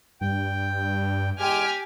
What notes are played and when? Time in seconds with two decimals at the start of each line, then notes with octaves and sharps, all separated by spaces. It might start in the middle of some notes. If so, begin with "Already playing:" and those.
0.21 G2 G5
1.39 E2 G#3 G4 G#5 F6